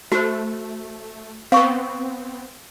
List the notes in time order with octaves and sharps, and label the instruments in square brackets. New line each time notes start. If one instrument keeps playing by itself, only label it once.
[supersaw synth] A3 [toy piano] F#4 C5
[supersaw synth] B3 C4 [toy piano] F5 C#6